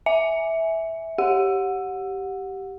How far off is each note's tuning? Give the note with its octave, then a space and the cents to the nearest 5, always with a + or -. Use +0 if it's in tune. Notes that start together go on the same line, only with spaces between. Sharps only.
E5 -10 G#5 +0
G4 -10 F#5 -20